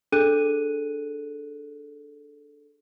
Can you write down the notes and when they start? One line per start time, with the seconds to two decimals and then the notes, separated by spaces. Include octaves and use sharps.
0.12 D4 G#4 A4 F#6 D#7